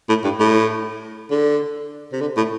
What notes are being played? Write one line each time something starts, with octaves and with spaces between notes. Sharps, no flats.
A2
G2
A2
D3
C3
D3
A2